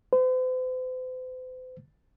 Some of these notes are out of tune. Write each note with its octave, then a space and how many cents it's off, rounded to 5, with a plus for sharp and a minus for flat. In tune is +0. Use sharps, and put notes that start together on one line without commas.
C5 -45